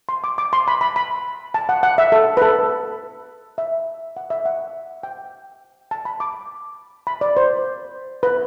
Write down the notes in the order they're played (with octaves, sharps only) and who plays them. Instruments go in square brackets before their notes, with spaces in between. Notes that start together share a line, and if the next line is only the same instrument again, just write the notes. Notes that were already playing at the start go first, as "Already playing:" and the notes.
[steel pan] C6
D6
D6
C6
B5
B5
B5
A5
F#5
F#5
E5
A4
B4
A4
E5
F#5
E5
F#5
G5
A5
B5
D6
B5
D5
C5
B4